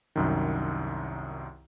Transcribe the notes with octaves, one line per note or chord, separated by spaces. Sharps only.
C2 F#2 D#3